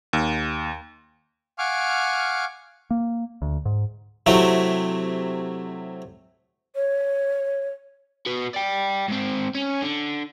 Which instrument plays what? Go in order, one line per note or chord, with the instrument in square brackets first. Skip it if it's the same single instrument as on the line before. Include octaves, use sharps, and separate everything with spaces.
[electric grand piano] D#2
[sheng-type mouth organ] F5 F#5 G#5 C#6 D6 F6
[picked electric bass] A#3
D2
G#2
[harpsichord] C3 F#3 A3 E4
[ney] C#5
[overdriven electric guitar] F#4 B4
D5 G5
G#2 C4
C#4
D3